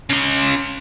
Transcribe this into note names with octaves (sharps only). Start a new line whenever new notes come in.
C#3 C6